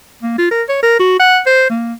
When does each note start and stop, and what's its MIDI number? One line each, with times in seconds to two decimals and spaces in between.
0.23 0.34 58
0.38 0.48 65
0.51 0.63 70
0.69 0.79 73
0.83 0.99 70
0.99 1.19 66
1.19 1.40 78
1.47 1.68 72
1.70 1.93 58